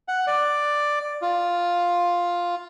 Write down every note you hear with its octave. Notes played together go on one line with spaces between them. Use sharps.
F#5
D5
F4